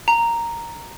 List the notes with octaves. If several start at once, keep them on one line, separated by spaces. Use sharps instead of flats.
A#5